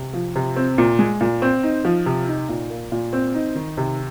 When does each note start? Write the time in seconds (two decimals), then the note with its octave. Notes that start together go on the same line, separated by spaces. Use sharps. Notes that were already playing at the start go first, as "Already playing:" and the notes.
Already playing: C3
0.14 F3
0.36 C3
0.56 C4
0.78 A#2
0.99 G#3
1.21 A#2
1.42 C4
1.63 D#4
1.85 F3
2.06 C3
2.28 D#4
2.49 A#2
2.70 A#3
2.92 A#2
3.13 C4
3.34 D#4
3.56 D#3
3.77 C3